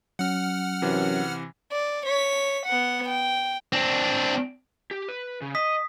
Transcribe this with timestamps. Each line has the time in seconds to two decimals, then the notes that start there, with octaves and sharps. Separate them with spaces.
0.19 F#3 C#4 F#5 F6
0.82 F#2 C3 E3
1.72 D5
2.06 C#5 B6
2.66 B3 F#5
3.08 G5
3.73 C4 D4
4.91 G4
5.09 B4
5.41 C#3
5.55 D#5 D#6 B6